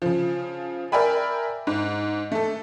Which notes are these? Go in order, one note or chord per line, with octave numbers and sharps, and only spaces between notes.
C#3 F3
A#4 D5 E5 G5 G#5 B5
G#2
A3 A4